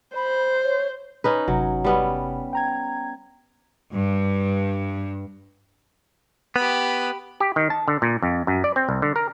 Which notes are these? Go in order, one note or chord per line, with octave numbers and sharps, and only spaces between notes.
C5 B5
C#5
C#4 D#4 B4
G1 C3 F#3
G3 B3 C#4
G5 A#5 G#6
G2
B3 G4 B5
G4
D#3
A5
D3
A#2
F2
F#2
D5
C4
C2
D3
A#4